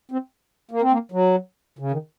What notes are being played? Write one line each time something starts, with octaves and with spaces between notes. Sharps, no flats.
C4
A#3
C4
A#3
F#3
C#3
D#3